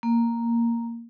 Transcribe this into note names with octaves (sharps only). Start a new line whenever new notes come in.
A#3